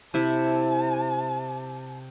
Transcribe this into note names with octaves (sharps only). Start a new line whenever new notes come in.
C3 E4 A5